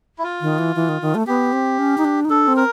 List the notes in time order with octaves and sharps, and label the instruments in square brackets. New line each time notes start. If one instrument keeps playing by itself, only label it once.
[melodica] E4
F4
[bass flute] D#3
E3
E3
D#3
D#3
A3
[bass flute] B3 [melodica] G4
[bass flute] C4
C#4
D#4
D4
D#4
[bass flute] D4 [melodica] A4
[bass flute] C4
[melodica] A#4